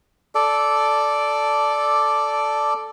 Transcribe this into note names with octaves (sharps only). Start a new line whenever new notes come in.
A4 D5